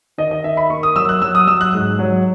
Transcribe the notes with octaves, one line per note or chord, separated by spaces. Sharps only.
D#3 D#5
D#5
D#3 E5
B5
A#3 C#6
D#6
F#3 E6
F#6
F#3 E6
D#6
F#3 E6
F#6
G#2
F#3